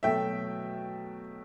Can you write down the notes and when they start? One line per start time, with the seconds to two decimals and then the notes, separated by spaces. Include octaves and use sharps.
0.03 B2 F#3 A3 E5 G5